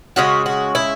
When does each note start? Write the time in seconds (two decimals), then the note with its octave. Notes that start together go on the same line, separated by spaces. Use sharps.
0.16 C#3 G#3 F#4
0.46 F#4
0.75 E4